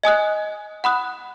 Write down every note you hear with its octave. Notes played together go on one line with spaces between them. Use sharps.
D#5 G#5 D#6 F#6
F#5 B5 D#6 F#6